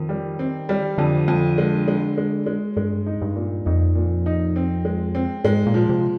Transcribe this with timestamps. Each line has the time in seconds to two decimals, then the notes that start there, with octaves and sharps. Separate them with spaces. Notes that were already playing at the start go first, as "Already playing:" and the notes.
Already playing: F2 D#3
0.09 G3
0.39 C4
0.69 G3
0.98 F2 D3
1.28 F2
1.58 G#3
1.88 G#3
2.17 G#3
2.46 G#3
2.76 G2 G#3
3.06 D#4
3.22 G2
3.36 A#2
3.66 F2 D#4
3.95 A#2
4.26 D#4
4.56 C4
4.85 G#3
5.15 C4
5.44 G#2 G#3
5.66 A#2
5.74 F3
5.89 C3